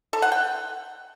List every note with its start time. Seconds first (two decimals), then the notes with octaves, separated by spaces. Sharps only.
0.13 A4
0.22 F#5
0.32 G5